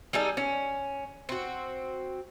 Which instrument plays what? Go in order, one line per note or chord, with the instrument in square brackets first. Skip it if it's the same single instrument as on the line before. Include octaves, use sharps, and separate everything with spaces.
[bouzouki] G3 D#4 G#4 A4
C#4
C4 F#4